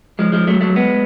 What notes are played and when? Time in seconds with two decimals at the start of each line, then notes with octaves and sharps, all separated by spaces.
0.19 F3 G#3
0.32 F3 G#3
0.47 F#3 A3
0.61 F#3 A3
0.75 G#3 B3